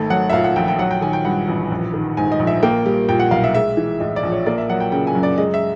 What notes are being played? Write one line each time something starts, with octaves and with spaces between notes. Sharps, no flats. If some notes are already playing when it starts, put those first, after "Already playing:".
Already playing: G#1 A3
F#3 F#5
E5
A#2 F5
F#5
A#1 G5
G5
F#3 F#5
G5
D#3 G#5
G5
G2 F#5
A1
A#1
D#3
G#2 G#5
D#5
A#1
E5
A#3 G5
G3
A#2 G5
F#5
B1 F5
E5
G#3 E5
E3
A2 D#5
D5
A#1
C#5
A#3 D5
E5
F#3 F#5
G5
C#3 G5
G#5
F#2
D5
G#3 D#5
E5